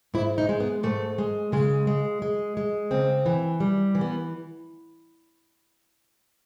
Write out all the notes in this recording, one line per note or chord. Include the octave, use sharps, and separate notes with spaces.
G#2 E4
D#4
G#3
B3
G#2 A3
G#3
C#3 G#3
G#3
G#3
G#3
C#3 C4
E3
G3
E3
B3